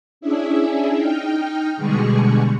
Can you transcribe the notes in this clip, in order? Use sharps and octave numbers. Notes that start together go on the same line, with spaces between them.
C#4 D4 E4 G#4 E5
D#4 G5 F6
B2 D3 G3 G#3 G#4 C#6